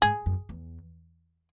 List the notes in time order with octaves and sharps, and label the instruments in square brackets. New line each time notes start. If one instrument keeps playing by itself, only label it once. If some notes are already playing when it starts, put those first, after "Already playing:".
[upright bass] G#2 [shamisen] G#4
[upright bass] F#2
E2